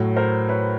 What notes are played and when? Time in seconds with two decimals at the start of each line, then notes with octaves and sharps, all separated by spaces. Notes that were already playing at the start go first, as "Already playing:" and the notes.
Already playing: A2 F#3
0.16 A#4 C5
0.49 B4 C#5